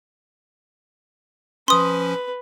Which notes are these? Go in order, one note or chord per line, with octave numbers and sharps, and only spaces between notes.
F3 C#4 B4 C6 D#6